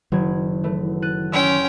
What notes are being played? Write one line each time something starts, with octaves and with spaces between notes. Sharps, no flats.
F#1 D#3 F#3 G#6
E3 A3
F#6 A6 D#7
C#4 G5 C6 E6